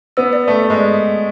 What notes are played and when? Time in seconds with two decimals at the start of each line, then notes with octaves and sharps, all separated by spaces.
0.17 B3 E6
0.33 D5
0.48 A3 A5
0.63 D5
0.70 G#3